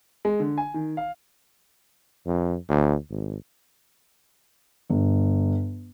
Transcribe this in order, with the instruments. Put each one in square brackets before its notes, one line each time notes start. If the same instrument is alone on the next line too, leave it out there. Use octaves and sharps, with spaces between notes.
[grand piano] G#3
D3
G#5
D#3
F5
[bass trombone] F2
D2
G#1
[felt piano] G1